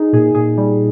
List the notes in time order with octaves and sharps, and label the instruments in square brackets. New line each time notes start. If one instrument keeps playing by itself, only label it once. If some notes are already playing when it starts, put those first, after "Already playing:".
Already playing: [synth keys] D#4 G#4
[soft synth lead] A#2 [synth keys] G#4
[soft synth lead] A#2 [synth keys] G#4
[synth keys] G3